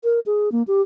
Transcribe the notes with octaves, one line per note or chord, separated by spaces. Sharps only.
A#4
G#4
A#3
G4